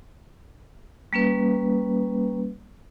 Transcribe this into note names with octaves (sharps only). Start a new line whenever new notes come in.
G3 A#3 C#4 B4